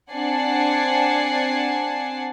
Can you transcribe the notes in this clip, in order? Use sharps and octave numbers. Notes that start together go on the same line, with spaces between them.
C4 D4 F#5 G#5 A5 C7